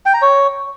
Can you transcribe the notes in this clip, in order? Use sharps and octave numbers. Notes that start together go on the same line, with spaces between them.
G5
A#5
C#5